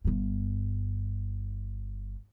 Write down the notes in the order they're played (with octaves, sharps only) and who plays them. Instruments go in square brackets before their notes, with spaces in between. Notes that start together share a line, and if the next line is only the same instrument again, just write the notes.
[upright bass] G1 G2